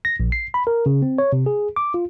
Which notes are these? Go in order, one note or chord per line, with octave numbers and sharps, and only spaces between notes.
A#6
A#1
C7
B5
A#4
C#3
C4
C#5
C3
G#4
D6
F4